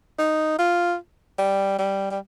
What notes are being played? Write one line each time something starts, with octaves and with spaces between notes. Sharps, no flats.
D#4
F4
G3
G3
G3